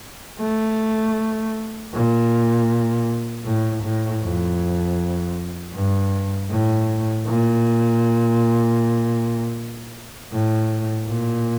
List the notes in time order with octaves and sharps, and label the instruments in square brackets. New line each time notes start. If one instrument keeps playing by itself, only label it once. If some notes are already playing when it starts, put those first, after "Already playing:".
[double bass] A3
A#2
A2
A2
F2
G2
A2
A#2
A2
A#2